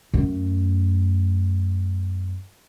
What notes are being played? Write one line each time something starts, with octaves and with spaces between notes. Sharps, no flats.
F#2 A3